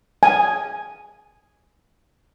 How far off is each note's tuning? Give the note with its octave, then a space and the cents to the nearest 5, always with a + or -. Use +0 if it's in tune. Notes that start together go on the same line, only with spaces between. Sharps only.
G#5 +0